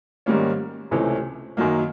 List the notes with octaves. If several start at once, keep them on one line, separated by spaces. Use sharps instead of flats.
G#2 D#3 G3 A#3 C#4
C#2 C3 E3 A3 C#4
F#2 D#3 F#3 A#3